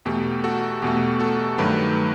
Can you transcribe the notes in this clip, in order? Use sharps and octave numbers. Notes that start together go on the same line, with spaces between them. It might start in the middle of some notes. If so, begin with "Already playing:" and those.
E2 B2 A3 G4
F#4 A4
E2 B2 A3 G4
F#4 A4
G2 D#3 F#3 A3 G4 B4